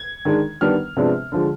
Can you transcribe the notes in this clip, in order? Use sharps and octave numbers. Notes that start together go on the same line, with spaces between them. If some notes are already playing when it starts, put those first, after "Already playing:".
Already playing: G#6
D#3 G#3 D4
D#3 G3 B3 D4 F6
C3 F3 G#3 B3 D4
D3 F3 G#3